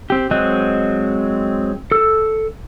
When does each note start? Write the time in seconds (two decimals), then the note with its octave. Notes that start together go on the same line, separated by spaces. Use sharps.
0.10 C4 G4
0.31 F#3 G#3 C4 D#5 F#6
1.91 A4 E6